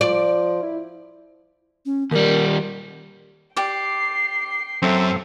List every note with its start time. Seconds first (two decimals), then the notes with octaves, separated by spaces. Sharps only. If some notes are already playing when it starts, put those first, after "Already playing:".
0.01 F3 D5
0.62 E4
1.86 C#4
2.11 D#2 G3 A#4
3.57 G4 D5 G5 C7
4.82 F#2 C4 A4 E5